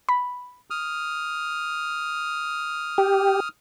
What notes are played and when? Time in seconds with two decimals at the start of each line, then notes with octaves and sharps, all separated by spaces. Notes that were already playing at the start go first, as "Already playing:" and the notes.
0.09 B5
0.70 D#6 F6
2.98 G4